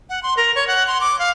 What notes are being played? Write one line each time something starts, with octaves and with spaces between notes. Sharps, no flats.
F#5
C6
A#4
C#5
F#5
C6
D6
F5